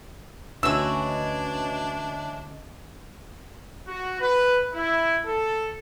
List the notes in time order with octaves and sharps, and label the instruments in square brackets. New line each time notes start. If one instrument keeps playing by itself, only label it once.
[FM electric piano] D2 C#4 D#5 [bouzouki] E3 F#4 [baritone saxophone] D4 [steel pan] E6
[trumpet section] F#4
B4
E4
A4